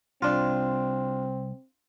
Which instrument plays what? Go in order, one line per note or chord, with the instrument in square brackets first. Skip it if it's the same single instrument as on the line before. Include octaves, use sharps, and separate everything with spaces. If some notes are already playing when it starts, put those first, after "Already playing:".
[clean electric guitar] C2 [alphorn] C4 [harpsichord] D4 F4